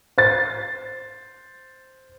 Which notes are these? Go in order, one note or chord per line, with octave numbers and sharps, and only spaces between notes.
C5 A6